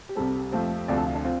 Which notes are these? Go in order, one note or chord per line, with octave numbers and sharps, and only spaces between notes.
G4
C2 C3 G3 C4 A4
F2 F3 A3 C4
D2 C3 F3 D5
A4
F4
D4
C4 F4